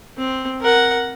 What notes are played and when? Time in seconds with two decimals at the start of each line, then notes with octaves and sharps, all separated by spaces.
0.17 C4
0.60 A#4 F#5